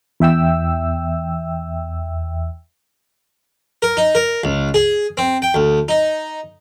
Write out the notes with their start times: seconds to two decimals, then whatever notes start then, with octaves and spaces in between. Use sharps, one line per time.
0.20 E2 E5 G5 E6
3.82 A#4
3.97 D#4
4.15 A#4
4.44 C#2
4.74 G#4
5.17 C4
5.42 G5
5.54 D2
5.89 D#4